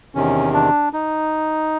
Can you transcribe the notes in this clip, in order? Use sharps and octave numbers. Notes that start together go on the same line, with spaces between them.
E2 C3 D#3 C#4
D4
D#4